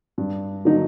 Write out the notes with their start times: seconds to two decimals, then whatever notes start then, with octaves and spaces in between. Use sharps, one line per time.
0.18 G2
0.65 D3 F#3 A#3 D#4